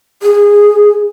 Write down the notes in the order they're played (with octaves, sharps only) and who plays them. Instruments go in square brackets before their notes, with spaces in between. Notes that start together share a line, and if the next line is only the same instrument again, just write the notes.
[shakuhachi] G#4